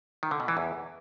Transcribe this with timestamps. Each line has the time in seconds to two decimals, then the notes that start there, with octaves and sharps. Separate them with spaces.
0.23 D#3
0.31 D3
0.40 B2
0.48 E3
0.57 E2